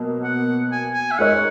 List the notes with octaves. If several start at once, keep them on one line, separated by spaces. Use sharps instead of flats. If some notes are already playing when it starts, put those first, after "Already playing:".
Already playing: B2 F#3 A#3
F#5
G#5
G#5
E5
G#3 D#4 A#4 C#5 F#5